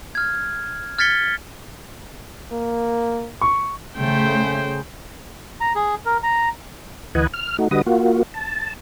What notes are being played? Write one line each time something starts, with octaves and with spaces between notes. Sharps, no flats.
F6 G#6
F6 G#6 A6 B6 C#7 G7
A#3
C#6
C#3 A3 C5 G5
A#5
G#4
A#4
A#5
D2 E3 B4 D#5 F#5 G#5
F6
A3 D#4 F#4
D3 G3 F#4 B4 D#5 D#6
A#3 F4 F#4
A5